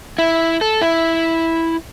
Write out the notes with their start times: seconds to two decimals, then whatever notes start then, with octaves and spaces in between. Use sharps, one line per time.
0.18 E4
0.61 A4
0.81 E4